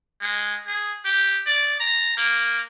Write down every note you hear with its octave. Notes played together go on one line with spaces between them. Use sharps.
G#3
G#4
G4
D5
A#5
A#3